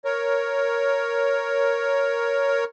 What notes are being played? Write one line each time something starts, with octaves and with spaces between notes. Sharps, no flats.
A#4 C#5